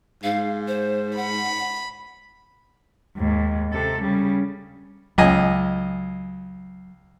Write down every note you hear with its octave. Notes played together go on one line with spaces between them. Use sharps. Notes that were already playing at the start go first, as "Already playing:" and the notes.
G#2 F5
C5
F#5 B5
D#2 G#2
C3 A4
C#3 G3
C#2 F#3 D#5 G#5